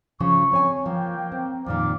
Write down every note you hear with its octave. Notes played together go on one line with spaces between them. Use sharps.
C#3 F3 C#4 C#6
C4 C#5 G#5
F3 A#3 G5
C4
F2 A#2 D#3 D5 F5 D6